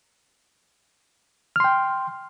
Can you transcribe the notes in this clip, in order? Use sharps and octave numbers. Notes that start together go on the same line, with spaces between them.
G5 C6 F6